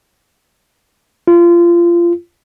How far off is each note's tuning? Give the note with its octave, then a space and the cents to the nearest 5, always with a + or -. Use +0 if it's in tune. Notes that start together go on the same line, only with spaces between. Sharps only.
F4 -25